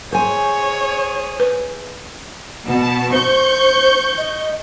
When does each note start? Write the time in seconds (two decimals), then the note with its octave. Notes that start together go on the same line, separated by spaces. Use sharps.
0.12 G#4 C5 C#5 G#5
1.40 B4
2.67 B2 A5
3.12 C5 C#6 G6
4.18 D#5